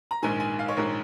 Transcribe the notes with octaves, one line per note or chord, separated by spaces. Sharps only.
A#5
A#1 G#2 D#3 G#5
G#5
F5
C#5
A#1 G#2 D#3 A#4